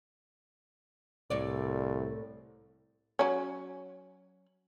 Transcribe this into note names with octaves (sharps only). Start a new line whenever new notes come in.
C2 A2 C#5 D5
F#3 C#4